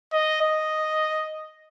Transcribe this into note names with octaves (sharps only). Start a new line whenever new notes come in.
D#5
D#5